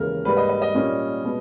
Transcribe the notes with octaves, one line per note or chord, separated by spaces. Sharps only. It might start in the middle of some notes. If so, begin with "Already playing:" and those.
Already playing: D#2 C#3 E3 G#3 A#4
G#2 G3 A#3 B4
D#5
D#5
D#5
A#2 G3 A#3 C#4
B2 G#3 B3